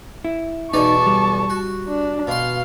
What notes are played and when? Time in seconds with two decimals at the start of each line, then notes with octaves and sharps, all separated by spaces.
0.24 E4
0.73 B1 E2 D#4 D5 A5 C#6
1.06 G3
1.50 F#4
1.88 D4
2.27 B2 F5 C6